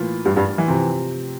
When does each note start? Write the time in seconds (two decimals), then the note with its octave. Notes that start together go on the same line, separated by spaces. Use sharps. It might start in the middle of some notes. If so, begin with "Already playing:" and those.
Already playing: A2 E3 A#3 F4
0.25 G2 G3
0.36 G2 G3
0.58 E3
0.68 C3 F3 C4